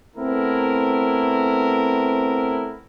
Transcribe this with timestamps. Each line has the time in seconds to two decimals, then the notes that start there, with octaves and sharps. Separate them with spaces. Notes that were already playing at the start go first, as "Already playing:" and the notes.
0.17 A3 B3 C4 E4 A#4